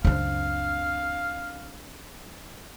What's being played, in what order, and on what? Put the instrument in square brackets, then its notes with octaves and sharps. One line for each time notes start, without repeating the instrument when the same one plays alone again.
[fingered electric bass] C#2 F#2 C#3 [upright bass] C4 D4 [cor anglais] F5